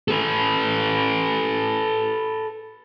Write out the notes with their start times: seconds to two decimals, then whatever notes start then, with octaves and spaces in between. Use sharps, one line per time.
0.08 A4 B4